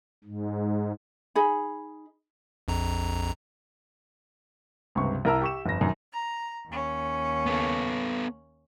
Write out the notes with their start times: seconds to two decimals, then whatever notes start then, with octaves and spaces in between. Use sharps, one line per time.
0.24 G#2
1.35 D#4 G#4 B5
2.68 A#1 F2 A#5
4.95 C#2 G2 C3 C#6
5.25 C2 E4 A#4 A5 A#5 E6
5.41 G4 C#6 E7
5.66 G1 F2 A#6
5.81 A#1 F#2 D#3
6.11 A#5
6.66 D#2 C#4
7.46 B3 A4